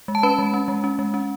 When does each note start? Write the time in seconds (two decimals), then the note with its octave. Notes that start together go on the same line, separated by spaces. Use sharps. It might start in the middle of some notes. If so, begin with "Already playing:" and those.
0.08 G#3
0.15 A5
0.23 C#4 B4 B5
0.39 G#3
0.54 C#4
0.68 G#3
0.84 C#4
0.99 G#3
1.14 C#4